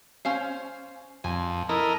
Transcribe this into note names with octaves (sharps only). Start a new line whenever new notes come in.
C#4 C5 F5
F2 G#5
E4 A4 A#4 D#5